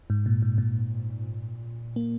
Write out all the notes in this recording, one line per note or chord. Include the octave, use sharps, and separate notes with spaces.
G#2
A#2
G#2
A#2
A#3